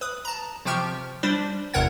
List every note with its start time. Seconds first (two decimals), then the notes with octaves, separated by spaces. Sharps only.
0.01 B4 D#6
0.25 A5 A#5
0.65 C3 F3 G4 C#6 F6 G6
1.23 G3 D4 C5
1.74 G1 E2 C3 A#4 F#5 G#6